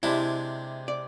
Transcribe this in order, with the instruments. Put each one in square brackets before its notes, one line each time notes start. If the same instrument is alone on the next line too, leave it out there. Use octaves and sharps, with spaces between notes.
[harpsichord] C3 G#3 D4 [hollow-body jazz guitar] E4
[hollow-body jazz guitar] D5